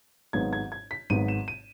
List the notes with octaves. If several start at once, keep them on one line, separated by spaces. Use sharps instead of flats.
G#1 G#2 F#3 B3 G#6
G#6
G#6
B6
G#1 G#2 F#3 B3 D#7
E7
D#7